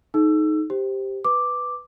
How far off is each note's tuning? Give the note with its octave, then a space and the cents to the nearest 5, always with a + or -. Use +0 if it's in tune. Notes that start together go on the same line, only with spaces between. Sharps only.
D#4 +0 A4 -45 E6 +20
G4 +0 C5 +0
B4 +5 D6 +0